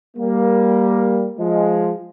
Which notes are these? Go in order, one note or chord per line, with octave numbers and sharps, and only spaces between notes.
G3 A#3
F3 G#3